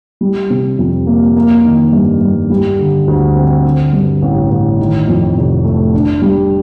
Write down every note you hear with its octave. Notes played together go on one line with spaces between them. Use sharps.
G3
C3
F2
A#3
A#3
D#3
G2
G2
G3
D3
D2
C4
D3
G2
A1
A1
D#3
F2
F1
A3
D4
G3